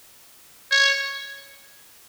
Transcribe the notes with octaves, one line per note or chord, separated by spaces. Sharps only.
C#5